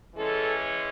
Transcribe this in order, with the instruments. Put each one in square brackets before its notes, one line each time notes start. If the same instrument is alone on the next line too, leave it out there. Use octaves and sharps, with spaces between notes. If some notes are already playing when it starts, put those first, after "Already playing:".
[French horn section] E3 G#3 C#4 A4